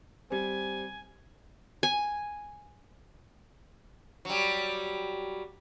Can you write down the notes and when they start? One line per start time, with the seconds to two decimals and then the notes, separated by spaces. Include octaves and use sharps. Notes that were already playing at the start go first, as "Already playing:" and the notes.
0.30 G3 C4 G#5
1.83 G#5
4.25 F#3 G3